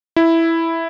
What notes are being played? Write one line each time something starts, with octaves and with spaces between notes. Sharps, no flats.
E4